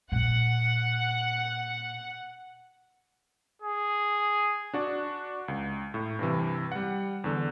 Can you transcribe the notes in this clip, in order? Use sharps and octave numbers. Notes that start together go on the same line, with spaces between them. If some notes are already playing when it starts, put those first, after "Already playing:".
A#2 F#5
G#4
D4 F#4 D5
C#2
A2
G2 C3 E3
G3 F#5
E2 D3